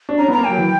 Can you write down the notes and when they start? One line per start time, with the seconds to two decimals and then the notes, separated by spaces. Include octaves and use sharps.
0.09 D4
0.18 C#4 A#5
0.28 B3
0.32 A#5
0.38 A#3
0.44 F#3 G5
0.58 E3